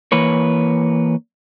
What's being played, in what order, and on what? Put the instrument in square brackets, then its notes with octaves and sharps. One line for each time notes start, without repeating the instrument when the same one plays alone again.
[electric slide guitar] E3 A#3 B4 C#5